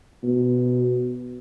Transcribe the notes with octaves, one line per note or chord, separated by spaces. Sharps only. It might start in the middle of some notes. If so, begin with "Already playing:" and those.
B2